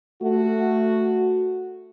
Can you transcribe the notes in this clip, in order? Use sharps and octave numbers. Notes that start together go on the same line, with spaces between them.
A3 F#4